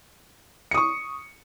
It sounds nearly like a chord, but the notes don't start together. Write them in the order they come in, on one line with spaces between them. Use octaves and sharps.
C#7 D#6 C#6